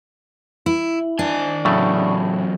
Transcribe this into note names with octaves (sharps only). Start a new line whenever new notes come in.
E4
D#3 D4 G#5
E2 A2 C#3 F#3 A3